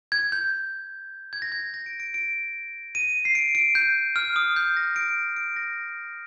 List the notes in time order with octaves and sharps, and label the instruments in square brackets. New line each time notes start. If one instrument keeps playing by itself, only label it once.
[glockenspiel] G#6
G6
G#6
A#6
G#6
A#6
D7
D7
D7
D#7
C7
D7
D7
G6
F6
D#6
G6
A#6
D7
D7
A#6